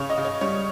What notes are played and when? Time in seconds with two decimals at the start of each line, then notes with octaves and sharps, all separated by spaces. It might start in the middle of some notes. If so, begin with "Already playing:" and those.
Already playing: C#3 C#5
0.10 D#5
0.18 C#3
0.25 C#5
0.41 G3 C#5